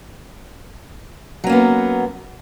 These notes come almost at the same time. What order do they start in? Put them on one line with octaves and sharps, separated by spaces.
F#3 C#4 A#3 B3